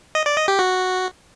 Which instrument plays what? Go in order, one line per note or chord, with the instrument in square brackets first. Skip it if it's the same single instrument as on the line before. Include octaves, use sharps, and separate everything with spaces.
[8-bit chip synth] D#5
D5
D#5
G4
F#4